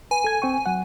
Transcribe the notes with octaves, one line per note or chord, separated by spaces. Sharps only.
B4 G#5
A4 G#6
C4 G5 C#6
F#3 F#5